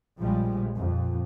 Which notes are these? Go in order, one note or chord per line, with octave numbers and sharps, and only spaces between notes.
A#1 C#3 F3 G3 G#3
F2 A#2